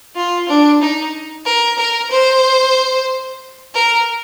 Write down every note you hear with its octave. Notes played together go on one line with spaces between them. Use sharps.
F4
D4
D#4
A#4
A#4
C5
A#4